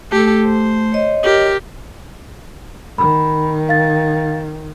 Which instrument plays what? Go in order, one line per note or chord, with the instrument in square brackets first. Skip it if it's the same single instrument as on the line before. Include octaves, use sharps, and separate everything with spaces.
[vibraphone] A3 [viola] G4 A4
[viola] C5
[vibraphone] C#5 D#5
[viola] G4 A#4
[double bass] D#3 [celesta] B5
[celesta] F5 A6